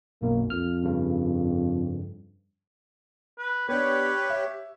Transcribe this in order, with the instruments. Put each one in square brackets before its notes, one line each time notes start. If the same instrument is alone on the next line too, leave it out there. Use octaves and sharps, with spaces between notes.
[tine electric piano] B1 F#2 B2 [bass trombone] A#3
[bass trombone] F2 [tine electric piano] F6
[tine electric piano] G2 C#3
[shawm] B4
[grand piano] B3 D4 [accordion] G4 C#5 [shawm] B4
[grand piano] E5